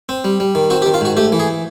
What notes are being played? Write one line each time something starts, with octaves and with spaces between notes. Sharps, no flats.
C4
G3
G3
D#3
C4 F#4
G4
D#3
F4
G#2 F#4
A3 G4
E3
G#4